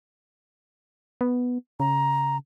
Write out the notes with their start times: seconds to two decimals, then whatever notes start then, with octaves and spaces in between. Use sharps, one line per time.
1.21 B3
1.80 C#3 A#5